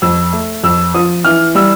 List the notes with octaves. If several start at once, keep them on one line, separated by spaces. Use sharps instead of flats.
F2 E6
A3
F2 E6
F3 D#6
E3 F6
G3 E6